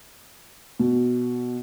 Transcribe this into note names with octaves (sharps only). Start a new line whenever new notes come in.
B2